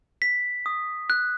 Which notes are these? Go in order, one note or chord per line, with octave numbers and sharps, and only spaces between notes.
B6
D#6
F#6